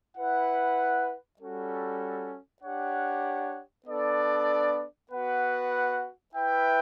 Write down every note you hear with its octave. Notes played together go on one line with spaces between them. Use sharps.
E4 B4 F#5
G3 C#4 F#4 A4
D4 G4 C#5 F#5
B3 D4 A4 D5
B3 F#4 B4 F#5
E4 B4 E5 G5